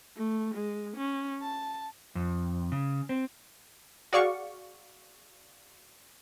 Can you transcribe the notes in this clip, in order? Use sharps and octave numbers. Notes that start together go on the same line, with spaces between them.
A3
G#3
C#4
A5
F2
C#3
C4
F#4 G#4 D5 F5 C#6